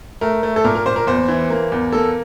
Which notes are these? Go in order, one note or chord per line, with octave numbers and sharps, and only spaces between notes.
A3 A#4
A3
A4
A#2 A#4
A#4
A#2 C5
A#4
E2 C5
E3
A#3
E2
A#3 A4